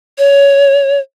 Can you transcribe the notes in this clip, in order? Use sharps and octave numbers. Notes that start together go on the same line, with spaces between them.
C#5